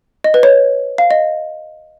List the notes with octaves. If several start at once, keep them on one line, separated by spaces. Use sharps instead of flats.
D#5
B4
C#5
F5
D#5